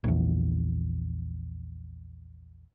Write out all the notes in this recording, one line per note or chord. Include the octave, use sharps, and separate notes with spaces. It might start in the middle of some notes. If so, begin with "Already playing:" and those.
A#1 E2